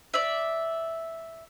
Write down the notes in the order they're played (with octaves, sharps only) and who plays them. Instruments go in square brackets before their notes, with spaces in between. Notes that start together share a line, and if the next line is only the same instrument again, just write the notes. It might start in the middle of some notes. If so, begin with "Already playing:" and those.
[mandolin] D5 E5